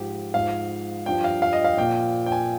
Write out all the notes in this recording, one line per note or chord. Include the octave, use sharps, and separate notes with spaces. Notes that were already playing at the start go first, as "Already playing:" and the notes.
Already playing: G#2 F3 G4
G#2 F3 F5
G2 F3 G5
F5
F5
D#5
F5
A#2 F3 G5
G5
G#5